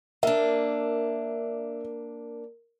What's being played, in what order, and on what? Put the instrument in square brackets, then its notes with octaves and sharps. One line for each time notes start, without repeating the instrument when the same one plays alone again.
[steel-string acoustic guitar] A#3 D4 [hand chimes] A#4 [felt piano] E5